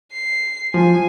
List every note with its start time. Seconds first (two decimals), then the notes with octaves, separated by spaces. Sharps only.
0.12 C7
0.74 F3 G#5